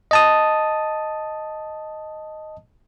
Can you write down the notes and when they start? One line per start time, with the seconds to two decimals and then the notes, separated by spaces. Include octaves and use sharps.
0.11 D#5 A5 D#6